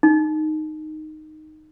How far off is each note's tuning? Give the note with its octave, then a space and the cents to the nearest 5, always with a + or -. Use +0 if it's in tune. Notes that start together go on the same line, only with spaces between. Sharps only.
D#4 -10